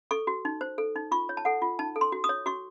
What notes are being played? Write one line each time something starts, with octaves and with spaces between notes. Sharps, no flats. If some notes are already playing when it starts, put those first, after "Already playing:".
A4 C#6
F#4
D#4
C5
A4
D#4
F4 C#6
C#5
A5
A4 F#5
F4
D#4 A5
A4
C6
F#4
D#6
C#5
F#4 C#6